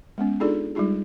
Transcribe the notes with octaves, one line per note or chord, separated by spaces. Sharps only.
G#3 B3 C#4
D4 D#4 F4 G#4 A4 D5
G3 G#3 D#4 F4 G#4